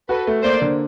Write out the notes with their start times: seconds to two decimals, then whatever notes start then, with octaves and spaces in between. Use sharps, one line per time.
0.09 F#4 A4 B4
0.27 A3
0.44 A#3 C5 D5
0.62 D3